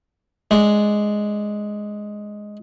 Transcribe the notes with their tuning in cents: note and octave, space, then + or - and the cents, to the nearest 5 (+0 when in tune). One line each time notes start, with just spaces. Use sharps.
G#3 +5 D4 +0